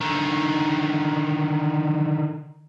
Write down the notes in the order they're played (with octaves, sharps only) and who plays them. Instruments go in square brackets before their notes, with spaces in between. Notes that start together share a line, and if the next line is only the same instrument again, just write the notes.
[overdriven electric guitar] D3 D#3